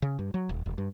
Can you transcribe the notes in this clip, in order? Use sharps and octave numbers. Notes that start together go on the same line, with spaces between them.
C#3
G2
F#3
D#1
E1
G2